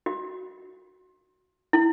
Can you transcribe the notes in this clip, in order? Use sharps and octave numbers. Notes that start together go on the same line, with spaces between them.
F#4
E4